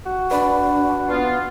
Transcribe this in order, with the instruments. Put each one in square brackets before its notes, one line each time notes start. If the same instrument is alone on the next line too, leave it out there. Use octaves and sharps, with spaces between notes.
[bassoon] F#4
[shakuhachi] D4 [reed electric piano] B4 D5 B5
[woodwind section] B3 F4